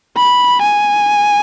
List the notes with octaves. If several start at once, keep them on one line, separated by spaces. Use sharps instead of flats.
B5
G#5